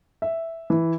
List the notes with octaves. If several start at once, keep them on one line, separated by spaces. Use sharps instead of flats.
E5
E3